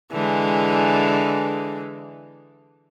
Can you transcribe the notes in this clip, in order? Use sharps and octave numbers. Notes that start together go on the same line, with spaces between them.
D3 E3 G#3